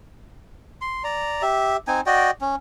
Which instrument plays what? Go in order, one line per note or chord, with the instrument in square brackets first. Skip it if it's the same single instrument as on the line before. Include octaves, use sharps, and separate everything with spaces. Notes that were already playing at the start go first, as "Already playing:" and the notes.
[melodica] C6
D5 A#5
G4 E5
C4 D#4 G#5
F#4 D5 D#5 G5
C#4